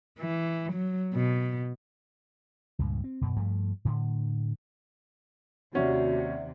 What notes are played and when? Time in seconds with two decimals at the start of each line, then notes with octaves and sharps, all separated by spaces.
0.20 E3
0.73 F#3
1.14 B2
2.79 C#2 G2 A#2
3.04 C4
3.21 F#2 B2
3.36 G2 F3 A3
3.85 A2 D3
5.75 D#2 C3 C#4 F#4 D5 E5 F#5